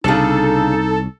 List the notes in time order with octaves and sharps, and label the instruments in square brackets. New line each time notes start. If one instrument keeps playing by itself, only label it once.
[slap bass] C2 [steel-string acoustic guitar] C#3 D4 [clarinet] D#4 [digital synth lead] A4